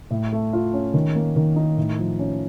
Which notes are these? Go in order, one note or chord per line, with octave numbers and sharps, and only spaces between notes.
A2
A3
F4
C#4
D#3
A#3
D#3
D#4
A2
F3
C#4